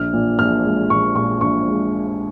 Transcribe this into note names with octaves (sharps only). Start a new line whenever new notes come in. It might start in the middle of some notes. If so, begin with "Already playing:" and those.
Already playing: A#1 F6
A#2
A#1 F6
G#3
A#1 C#6
A#2 C#6
A#1 C#6
G#3